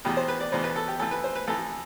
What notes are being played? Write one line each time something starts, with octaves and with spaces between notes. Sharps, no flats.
E2 B2 G4
C5
B4
D5
E2 B2 C5
B4
A4
G4
F2 E3 A4
B4
C5
B4
F2 E3 A4